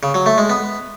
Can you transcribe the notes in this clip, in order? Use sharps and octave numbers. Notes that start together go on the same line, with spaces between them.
C#3
F#3
A3
G#3
B3